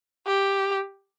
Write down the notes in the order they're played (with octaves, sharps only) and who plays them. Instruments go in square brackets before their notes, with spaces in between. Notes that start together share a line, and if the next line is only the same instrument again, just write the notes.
[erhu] G4